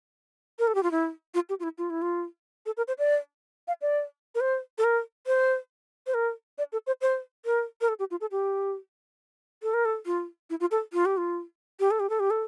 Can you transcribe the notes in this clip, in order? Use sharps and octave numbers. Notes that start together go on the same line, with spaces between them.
A#4
A4
G4
F4
E4
F4
G4
F4
E4
F4
E4
F4
A4
A#4
C5
D5
F5
D5
A#4
C5
A4
A#4
C5
C5
A#4
D5
A4
C5
C5
A#4
A#4
A4
G4
F4
A4
G4
A4
A#4
A4
F4
E4
F4
A4
F4
G4
F4
G4
A4
G4
A4
G4
A4